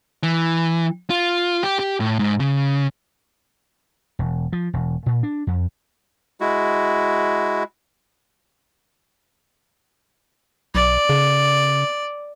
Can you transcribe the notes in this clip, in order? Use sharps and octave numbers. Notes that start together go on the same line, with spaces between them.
E3
F4
G4
G4
A2
G#2
C#3
E1
F3
E1
A#2
D4
F2
G#3 E4 F#4
B1 D5
C#3